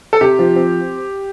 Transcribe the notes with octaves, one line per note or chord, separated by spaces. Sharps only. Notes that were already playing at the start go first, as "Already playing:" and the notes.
A4
C3 G4
F3
C4